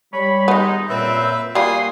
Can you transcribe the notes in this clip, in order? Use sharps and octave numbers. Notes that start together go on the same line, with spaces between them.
G3 C#5 B5
D#3 G#3 B3 D#4
F#2 A#2 C4 B4 E5
G3 A#3 F4 F#4 G#5 C6 D#6